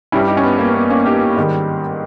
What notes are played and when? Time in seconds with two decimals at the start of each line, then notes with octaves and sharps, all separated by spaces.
0.12 G2 G3 C#4 E4
0.27 D#4 G4
0.37 C#4
0.43 B3
0.59 A#3
0.74 B3
0.90 A#3 C#4
1.05 D#4 G4
1.36 G#2 D#3 G3